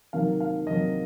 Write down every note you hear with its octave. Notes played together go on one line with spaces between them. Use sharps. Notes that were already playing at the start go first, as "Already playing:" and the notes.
C3 D#3 F#3 A#3 F5
F5
C3 D#3 F#3 A#3 D#5